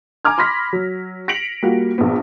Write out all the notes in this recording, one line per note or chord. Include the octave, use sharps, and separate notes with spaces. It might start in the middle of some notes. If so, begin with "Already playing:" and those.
G#5 A#5 D6 F6 G#6
B5 C6 D6 A#6 B6
F#3
A#6 B6 C#7 D7 F7 F#7
G3 A#3 F4 F#4
A#1 B3